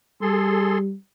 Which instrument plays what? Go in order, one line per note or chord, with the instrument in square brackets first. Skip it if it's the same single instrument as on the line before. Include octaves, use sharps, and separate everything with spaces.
[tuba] G3 [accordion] G#4 A4 C6